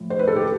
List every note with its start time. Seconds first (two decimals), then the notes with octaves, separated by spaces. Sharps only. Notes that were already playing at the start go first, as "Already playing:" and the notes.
Already playing: A2 F3
0.10 C5
0.19 B4
0.28 A4
0.36 G4